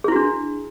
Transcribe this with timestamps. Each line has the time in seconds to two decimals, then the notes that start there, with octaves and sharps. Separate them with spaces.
0.04 G#4
0.08 E4
0.12 F#4
0.16 D4